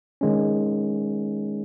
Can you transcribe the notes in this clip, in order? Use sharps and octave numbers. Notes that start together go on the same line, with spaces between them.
D#3 G#3 C#4